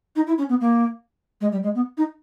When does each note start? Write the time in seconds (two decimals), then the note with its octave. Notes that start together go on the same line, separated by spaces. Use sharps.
0.16 D#4
0.27 E4
0.38 C#4
0.49 B3
0.61 A#3
1.41 G#3
1.52 G3
1.63 G#3
1.75 B3
1.97 D#4